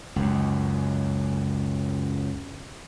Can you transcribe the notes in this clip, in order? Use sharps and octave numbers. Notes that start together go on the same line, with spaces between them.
C#2 F#2